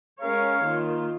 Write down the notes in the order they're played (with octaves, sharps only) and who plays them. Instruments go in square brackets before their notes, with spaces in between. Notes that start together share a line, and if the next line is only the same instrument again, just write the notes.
[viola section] G#3 C#4 A#4 C#5 [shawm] F5
[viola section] D#3 A#3 F4